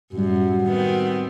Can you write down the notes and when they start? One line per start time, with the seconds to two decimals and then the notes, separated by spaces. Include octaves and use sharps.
0.13 F#2 A2 G3 F#4
0.65 D#3 B3 C4